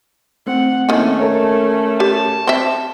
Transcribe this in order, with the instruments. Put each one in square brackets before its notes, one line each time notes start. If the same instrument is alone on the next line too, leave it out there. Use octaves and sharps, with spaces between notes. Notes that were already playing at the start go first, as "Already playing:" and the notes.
[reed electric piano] A3 C4 [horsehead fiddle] F#5
[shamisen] D#3 G#5 [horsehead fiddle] A3 C#4 [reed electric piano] A#3 C4 E4
[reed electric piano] A4 A#4 C#5
[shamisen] G4 [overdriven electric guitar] A5
[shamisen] C4 E5